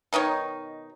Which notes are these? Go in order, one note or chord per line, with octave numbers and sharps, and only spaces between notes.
B2 D#3 D#4 C#5